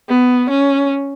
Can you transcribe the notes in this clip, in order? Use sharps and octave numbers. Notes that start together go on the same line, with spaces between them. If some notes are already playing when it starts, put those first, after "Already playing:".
B3
C#4